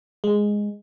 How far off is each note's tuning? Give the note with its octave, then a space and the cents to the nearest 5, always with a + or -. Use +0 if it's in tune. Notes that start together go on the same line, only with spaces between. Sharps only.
G#3 -5